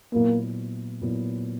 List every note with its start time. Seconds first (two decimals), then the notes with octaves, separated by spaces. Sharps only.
0.12 A#2 F#3 A#3 B3 E4
1.02 A#2 F#3 B3 E4